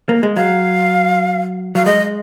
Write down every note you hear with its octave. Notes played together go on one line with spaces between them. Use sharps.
A#3
G#3
F#3 F5
F#3 F5
G#3 D#5